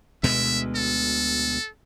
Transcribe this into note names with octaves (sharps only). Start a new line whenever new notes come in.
D2 B2 G#3 E5
A4